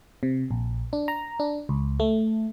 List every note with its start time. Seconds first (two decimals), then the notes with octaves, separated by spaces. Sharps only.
0.23 C3
0.51 A#1
0.93 D4
1.08 A#5
1.40 D4
1.69 C#2
2.00 A3